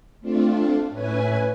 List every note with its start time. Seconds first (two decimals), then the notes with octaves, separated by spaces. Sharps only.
0.21 A3 C4 D4 F4
0.89 A2 C#4 E4 B4 G#5